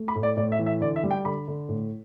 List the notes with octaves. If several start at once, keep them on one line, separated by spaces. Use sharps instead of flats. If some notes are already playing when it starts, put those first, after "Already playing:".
Already playing: A3
B5
A2
D5
A2 D5
E5
E3
E5
D3 D5
E5
G3
G5
D3 B5
D3
A2